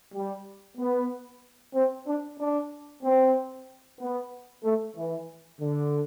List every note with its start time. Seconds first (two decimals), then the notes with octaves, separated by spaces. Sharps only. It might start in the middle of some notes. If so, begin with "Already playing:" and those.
0.12 G3
0.77 B3
1.74 C4
2.06 D4
2.38 D4
3.02 C4
3.99 B3
4.63 A3
4.95 E3
5.60 D3